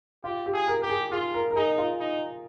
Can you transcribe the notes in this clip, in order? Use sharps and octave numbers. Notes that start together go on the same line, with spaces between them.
F4 G4
G4
G#4
A#4
G4 A#4
G#4
F4 G#4
A#4
A#4
D#4 G#4
F4
D#4